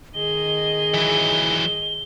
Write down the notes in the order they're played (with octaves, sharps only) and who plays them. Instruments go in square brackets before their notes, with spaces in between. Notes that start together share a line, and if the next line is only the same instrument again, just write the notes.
[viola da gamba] D#3 G#4 D#5 [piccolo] G7
[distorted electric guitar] E3 F#3